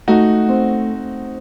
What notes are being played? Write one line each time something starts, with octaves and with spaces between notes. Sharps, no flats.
A3 D#4 F#4
C4